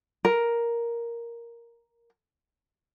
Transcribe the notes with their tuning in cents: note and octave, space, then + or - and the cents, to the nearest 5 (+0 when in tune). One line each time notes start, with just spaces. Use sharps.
A#4 +5